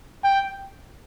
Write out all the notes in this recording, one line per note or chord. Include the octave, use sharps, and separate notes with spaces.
G5